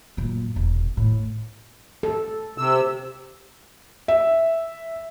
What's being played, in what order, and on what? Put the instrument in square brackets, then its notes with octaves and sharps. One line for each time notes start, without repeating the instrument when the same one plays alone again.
[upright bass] F#2 A#2
E1
A2
[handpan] A4
[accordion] C3 E6
[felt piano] E5